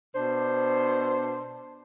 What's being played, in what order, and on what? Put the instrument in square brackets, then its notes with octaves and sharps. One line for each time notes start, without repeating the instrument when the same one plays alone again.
[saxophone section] B2 D4 C5